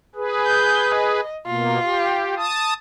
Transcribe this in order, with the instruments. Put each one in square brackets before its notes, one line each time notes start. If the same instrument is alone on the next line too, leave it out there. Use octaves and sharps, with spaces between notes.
[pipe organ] G#4 B4
[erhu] G6
D#5
[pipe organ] B2 A#3 [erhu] F4
[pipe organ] G4
A5 D#6